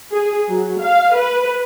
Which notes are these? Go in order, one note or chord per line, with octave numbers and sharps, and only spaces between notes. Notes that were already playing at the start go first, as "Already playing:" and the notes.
G#4
F#3
F5
B4